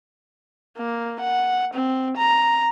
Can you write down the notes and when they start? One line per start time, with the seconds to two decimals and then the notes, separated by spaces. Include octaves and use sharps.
0.78 A#3
1.21 F#5
1.73 C4
2.17 A#5